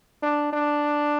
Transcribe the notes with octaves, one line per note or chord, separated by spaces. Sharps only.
D4
D4